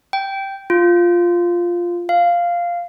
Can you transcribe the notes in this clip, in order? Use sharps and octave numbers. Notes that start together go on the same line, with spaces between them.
G5
F4
F5